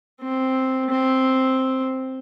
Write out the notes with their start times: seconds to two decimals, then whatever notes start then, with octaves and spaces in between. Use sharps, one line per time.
0.21 C4
0.90 C4